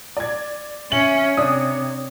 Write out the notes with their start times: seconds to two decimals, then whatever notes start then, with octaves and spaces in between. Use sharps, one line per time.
0.17 D5 G#6
0.92 C#4 C#5 E5 F#7
1.37 C3 D4 D5 D#6